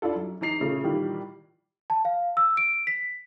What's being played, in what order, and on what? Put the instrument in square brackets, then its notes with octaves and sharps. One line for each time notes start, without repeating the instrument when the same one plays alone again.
[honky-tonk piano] D4 E4 F4 A4
F#2
E3 D#4 A#5 C7 F7
A#2 C#3 A3
A#2 D#3 E3 G3
[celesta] A5
F5
E6
D7
B6